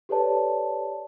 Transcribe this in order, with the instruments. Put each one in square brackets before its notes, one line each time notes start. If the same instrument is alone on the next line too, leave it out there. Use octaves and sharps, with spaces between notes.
[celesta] G4 A4 B4 C#5 D5 A5